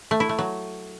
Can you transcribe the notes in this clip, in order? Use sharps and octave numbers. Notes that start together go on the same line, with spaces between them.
A3
E4
A3
F#3